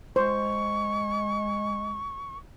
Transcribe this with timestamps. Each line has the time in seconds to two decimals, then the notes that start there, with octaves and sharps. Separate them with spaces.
0.16 G#3 C5 C#6